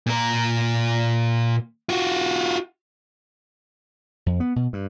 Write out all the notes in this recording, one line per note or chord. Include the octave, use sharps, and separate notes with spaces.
A#2 A#4
F4 F#4
F2
B3
B2
G2